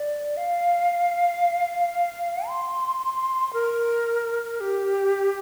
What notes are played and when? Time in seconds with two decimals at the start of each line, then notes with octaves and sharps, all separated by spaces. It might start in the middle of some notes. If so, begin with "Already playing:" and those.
Already playing: D5
0.37 F5
2.48 C6
3.53 A#4
4.60 G4